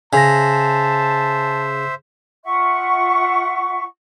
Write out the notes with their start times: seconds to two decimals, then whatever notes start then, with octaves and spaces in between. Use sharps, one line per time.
0.13 C#3 C5 E5 G#5 A5 A#6
2.45 F4 E5 F#5 C#6